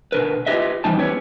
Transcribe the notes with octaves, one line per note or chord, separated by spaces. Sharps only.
B2 D3 A#4 B4
E4 F4 G4 B4 D#5 E5
F2 G#2 E3 G3 D#4 A5
B3 C#4 E4 G4 B4 C#5